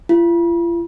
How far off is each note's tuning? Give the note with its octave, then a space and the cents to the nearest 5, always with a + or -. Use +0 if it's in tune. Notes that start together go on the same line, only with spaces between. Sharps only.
F4 -45